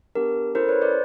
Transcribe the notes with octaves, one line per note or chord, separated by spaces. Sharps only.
B3 D4 G4 A#4
C#4 E4 A4 A#4 C5
B4 C#5
C5 D5